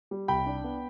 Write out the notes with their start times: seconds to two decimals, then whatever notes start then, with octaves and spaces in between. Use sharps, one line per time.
0.11 G3
0.28 C2 G5 B5
0.46 D4
0.64 B3